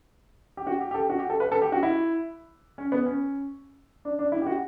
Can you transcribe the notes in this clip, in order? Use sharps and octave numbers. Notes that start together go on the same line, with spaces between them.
G4
F#4
G4
G4
A4
F#4
G4
A4
B4
A4
G4
F#4
E4
C#4
B3
C#4
D4
D4
E4
G4
F#4